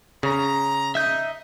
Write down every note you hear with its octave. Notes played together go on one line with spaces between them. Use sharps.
C#3 A#5
D#4 D#5 E5 G6